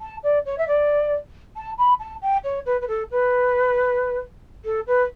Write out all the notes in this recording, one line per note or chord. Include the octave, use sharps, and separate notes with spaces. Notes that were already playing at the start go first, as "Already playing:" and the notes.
A5
D5
C#5
E5
D5
A5
B5
A5
G5
C#5
B4
B4
A4
B4
A4
B4